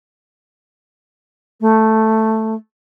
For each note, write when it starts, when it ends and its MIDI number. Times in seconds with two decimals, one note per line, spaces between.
1.61 2.54 57